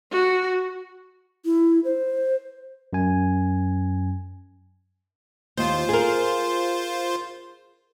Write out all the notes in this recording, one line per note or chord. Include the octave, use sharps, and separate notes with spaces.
F#4
E4
C5
F#2 G#5
D#2 F4 C5
G#4 A#4